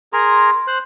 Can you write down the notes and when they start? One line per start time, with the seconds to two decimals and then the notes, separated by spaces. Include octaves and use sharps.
0.13 G#4 A#4 A#5 C6
0.67 C5 F#6